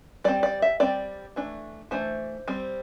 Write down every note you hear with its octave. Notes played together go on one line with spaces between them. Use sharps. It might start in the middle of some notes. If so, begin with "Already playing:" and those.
G3 C4 D5
D5
E5
G3 C4 D5
E3 A3 D4
E3 A3 D4 C5
G3 C4